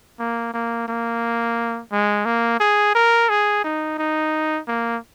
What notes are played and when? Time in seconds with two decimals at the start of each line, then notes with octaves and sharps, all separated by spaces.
0.19 A#3
0.54 A#3
0.88 A#3
1.92 G#3
2.26 A#3
2.60 G#4
2.95 A#4
3.29 G#4
3.64 D#4
3.99 D#4
4.68 A#3